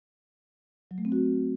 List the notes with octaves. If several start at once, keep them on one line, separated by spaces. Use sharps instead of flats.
F#3
A3
C4
F#4